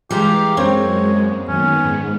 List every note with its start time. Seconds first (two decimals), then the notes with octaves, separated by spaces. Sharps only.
0.11 E3 G3 G#3 G4 F5 A#5
0.57 F#2 G#3 A#3 C4 C#5
1.48 F#2 D#3 B3 C#4
1.84 G#2